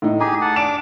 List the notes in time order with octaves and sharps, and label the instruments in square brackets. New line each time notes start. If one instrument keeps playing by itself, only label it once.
[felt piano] A2 D#4
[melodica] G4 G#4 G#5 [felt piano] A#5
[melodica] F#5 A5
[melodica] D4 D6 [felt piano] D7 E7